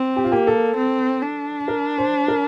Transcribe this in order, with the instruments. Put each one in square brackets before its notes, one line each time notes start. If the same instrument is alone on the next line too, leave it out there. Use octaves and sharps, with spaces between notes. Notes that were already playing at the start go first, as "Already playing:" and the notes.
Already playing: [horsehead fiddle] C4
[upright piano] G4
F4
[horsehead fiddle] A#3 [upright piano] G4
[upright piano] A4
[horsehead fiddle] C4
D4
[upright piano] A#4
C5
A#4